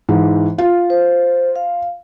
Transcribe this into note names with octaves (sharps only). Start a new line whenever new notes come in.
G#2 E3
F4
C5
F5